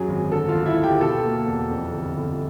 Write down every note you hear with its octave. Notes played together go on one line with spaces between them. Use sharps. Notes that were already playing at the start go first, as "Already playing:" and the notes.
Already playing: F#2 F#3 G#4
G#1
D3 A4 A5
F4 F5
D2
E4 E5
D2
G4 G5
B2 A4 A5
A#3
E2
F2
G1
G1